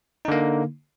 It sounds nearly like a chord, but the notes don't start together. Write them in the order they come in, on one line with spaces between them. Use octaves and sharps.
D#4 D3 A#3